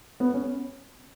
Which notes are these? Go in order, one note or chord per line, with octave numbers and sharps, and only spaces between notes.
B3
C#4